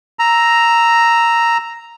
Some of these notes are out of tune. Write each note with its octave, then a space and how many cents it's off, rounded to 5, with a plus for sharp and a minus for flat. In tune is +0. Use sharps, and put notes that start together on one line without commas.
A#5 +0 E6 +0